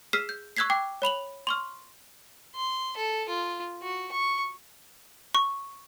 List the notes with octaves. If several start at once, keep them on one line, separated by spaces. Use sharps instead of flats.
G#4 E6 F6 B6 C7 E7
G6
C#6 E6 F#6 G#6 B6 C7
G5 D6
C#5 B5 F7 F#7
C6 C#6 F6
C6
A4
F4
F#4
C#6
C#6